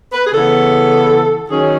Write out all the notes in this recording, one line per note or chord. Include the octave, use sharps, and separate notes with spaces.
B4
G#4
C#3 E3 B3 A4
D#3 F#3 C#4 G#4